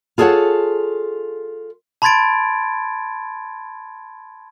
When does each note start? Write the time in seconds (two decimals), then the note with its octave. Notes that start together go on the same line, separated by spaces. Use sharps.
0.18 F4 G#4 A4 B4 C#5 F#5
2.02 A5 B5 C6 G#6 A6 D7